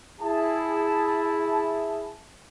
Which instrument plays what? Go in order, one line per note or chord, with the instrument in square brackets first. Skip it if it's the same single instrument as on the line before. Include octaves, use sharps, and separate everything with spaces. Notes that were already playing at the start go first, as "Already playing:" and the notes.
[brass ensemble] E4 G#4 A5